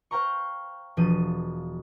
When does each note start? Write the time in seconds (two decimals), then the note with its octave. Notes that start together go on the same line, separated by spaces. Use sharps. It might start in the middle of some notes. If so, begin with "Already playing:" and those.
0.11 C5 F5 G5 A#5 C#6
0.97 E1 F3 D#7